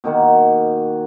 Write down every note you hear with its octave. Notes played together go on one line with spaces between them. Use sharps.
B2 D#3 A#3 F#5